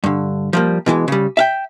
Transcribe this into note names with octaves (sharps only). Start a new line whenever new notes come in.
G2 D3
F3 G3 A#3
B2 E3 F#3 G#3
C#3 G3
E5 F5 G5